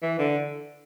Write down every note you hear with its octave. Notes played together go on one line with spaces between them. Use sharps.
E3
D3